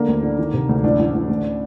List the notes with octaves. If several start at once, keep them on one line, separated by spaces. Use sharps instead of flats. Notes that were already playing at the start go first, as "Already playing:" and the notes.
Already playing: D3 A#3
D2
D3
D#3
C3
D2
A1 D4
A1
A1
D2